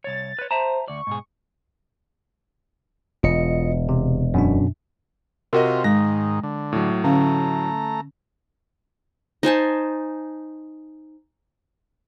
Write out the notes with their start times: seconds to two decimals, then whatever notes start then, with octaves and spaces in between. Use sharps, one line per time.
0.04 C2 C#5 A6
0.39 B4 C#5
0.51 C5 E5 A5 A#5
0.88 D2 D5 C#6
1.07 G#2 B2 G#4
3.23 E1 F4 D#5 C#7
3.89 C3
4.34 F#2 B2 D4
5.53 C3 C4 F4 F#4 A#4 D#5
5.84 G#2 D#3 G#3 A#6
6.43 D3
6.73 A2 F#3
7.04 D3 A3 C#4 F5 A#5
9.43 D#4 C5 G#5 A5